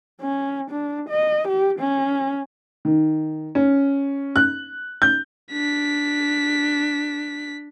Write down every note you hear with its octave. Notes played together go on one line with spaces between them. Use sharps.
C#4
D4
D#5
G4
C#4
D#3
C#4
F#6
G6
D4 B6